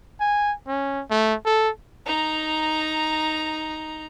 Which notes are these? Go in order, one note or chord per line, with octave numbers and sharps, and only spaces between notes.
G#5
C#4
A3
A4
D#4 A#5